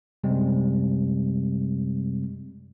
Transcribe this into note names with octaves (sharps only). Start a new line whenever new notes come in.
F#2 C3 G3 G#3 C4